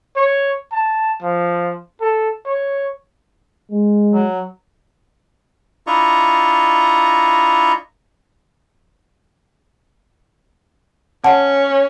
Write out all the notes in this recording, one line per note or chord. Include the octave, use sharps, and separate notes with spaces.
C#5
A5
F3
A4
C#5
G#3
F#3
D4 E4 F4 D#5 A#5 C#6
C#4 F#5 A5